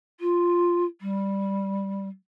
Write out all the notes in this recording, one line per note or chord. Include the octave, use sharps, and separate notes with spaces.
F4
G3